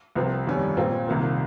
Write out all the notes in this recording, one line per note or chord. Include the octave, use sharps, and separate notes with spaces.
C2 C3 F3 C4
G1 F2 D#3 G3 C#4
A#2 G#3 C4 F4
C2 C3 D#3 A#3 F4